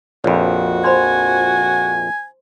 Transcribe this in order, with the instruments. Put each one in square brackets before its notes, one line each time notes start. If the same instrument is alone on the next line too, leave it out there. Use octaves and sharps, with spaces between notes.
[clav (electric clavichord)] A#1 F2 [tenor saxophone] F#4 [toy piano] C#5 B5
[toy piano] C5 B5 C6 [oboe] G#5